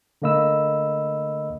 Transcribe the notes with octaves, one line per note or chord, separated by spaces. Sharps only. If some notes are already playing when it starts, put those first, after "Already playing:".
D3 A3 A#3 D#5 B5 E6